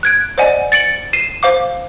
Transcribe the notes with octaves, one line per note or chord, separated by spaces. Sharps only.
F#6 G#6 D7
C5 D5 D#5 F#5 G#5
A6 C#7 D7 F#7
C7 D#7 E7
C5 F5 D6